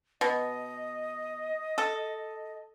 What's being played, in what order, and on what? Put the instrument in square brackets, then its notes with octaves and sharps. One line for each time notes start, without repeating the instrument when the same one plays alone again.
[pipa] B2 [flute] D#5
[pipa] A4